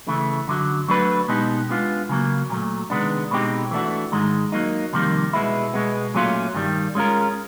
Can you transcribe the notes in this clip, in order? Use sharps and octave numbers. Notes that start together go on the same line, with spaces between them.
C#3 E3 A3
F#2 D3 F#3
F#3 A3 D4 F#4 B4
B2 G#3 B3 D#4 G4
G#3 B3 D4 F4
C#3 F#3 A#3
A#2 F#3 A3
C3 D#3 G#3 B3 D4
B2 G#3 C4 D#4 G4
E3 A3 D4 F#4
G#2 D#3 G#3
F#3 A#3 D#4
F2 C3 D#3 G3 A#3
B2 G#3 B3 E4
B2 G#3 B3
A#2 F#3 A3 C#4 F4
G2 D#3 G3
G#3 C#4 F4 A#4